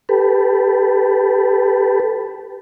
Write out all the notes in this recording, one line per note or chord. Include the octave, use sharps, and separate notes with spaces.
G4 A4 B4